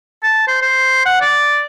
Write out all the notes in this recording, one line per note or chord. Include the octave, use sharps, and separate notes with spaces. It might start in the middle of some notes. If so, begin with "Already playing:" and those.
A5
C5
C5
F#5
D5